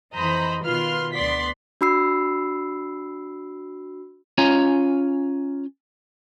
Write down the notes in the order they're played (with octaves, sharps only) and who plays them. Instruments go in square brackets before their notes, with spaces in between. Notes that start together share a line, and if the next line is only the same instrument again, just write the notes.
[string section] F2 E3 C5 D#5 A#5 B5
B2 D#3 F4 B4 C6 F6
D2 B3 D5 C6 B6
[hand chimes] D4 F#4 B5 E6 C7
[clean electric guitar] C#4 F4 C#5 F5 G#5 A#5